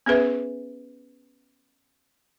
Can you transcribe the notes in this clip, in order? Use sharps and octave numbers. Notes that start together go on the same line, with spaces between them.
B3 C#4 G#4 B4 E5